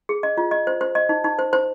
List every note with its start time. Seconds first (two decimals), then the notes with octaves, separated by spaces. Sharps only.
0.09 G#4
0.23 D#5
0.37 F4
0.51 D#5
0.67 C5
0.81 C5
0.95 D#5
1.09 D#4
1.24 D#4
1.39 C5
1.53 C5